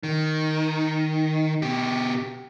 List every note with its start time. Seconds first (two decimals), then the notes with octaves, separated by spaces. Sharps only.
0.03 D#3
1.62 B2 G4